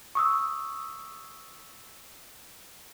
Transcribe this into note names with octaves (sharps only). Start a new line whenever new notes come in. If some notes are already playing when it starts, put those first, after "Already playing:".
C#6 D#6 E6